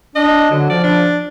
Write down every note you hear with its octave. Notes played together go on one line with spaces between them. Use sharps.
D4 D#5
D3 F#3
F3 D5
D4